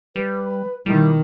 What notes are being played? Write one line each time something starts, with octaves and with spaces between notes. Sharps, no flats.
G3 B4
B2 D#3 G3 E4